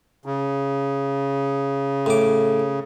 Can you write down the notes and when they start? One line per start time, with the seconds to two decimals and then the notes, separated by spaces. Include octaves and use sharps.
0.26 C#3
2.06 A2 D6